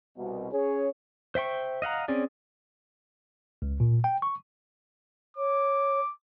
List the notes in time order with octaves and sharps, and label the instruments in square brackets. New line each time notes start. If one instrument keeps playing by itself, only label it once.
[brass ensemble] C2 B2
C#4 G#4 C#5
[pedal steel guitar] C5 E5 G5 C#6
D#5 F5 F#5 A#5
C4 C#4 G#4 D5
[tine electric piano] C#2
A#2
G5
C#6
[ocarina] C#5 [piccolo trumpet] D6